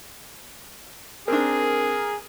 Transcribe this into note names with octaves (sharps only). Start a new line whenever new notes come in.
C4 D4 G#4 A#4